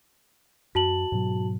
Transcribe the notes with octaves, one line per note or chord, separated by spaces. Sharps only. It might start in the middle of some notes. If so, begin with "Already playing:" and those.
F#2 F#4 A5 F#7
G#2 B2 F#3